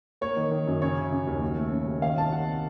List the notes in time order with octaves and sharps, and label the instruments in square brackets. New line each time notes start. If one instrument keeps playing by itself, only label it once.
[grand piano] A#3 C#5
D#3
D#3
F#2
C#3 C#5
C#3
C#3
D#2
F#3
A3
C#3
D#2
D#3 F5
C2 A5
C3 F#5